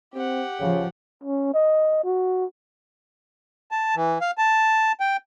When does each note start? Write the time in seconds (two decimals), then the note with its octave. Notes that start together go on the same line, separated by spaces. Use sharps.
0.14 C4 G4 F#5
0.60 C#3 F3
1.24 C#4
1.54 D#5
2.05 F#4
3.71 A5
3.96 E3
4.21 F5
4.38 A5
5.00 G5